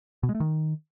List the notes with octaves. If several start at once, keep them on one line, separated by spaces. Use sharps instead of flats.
B2
G#3
A3
D#3